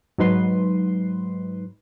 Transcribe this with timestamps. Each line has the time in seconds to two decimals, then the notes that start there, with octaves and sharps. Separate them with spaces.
0.18 G#2 F#3 D#4 B4 C6